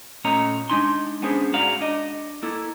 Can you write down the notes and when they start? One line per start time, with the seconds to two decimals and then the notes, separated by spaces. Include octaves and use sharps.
0.24 A#2 A3 C#4 C#5 D#5 A#5
0.70 G#3 A3 D4 D#4 G#5 C6
1.22 B3 C#4 D4 G#4 C5
1.54 G#2 F#4 G#4 D5 F5 A#5
1.81 D4 D#5
2.43 A#3 E4 A4